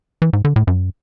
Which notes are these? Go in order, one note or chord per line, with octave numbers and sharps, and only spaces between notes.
E3
G#2
D3
A2
F#2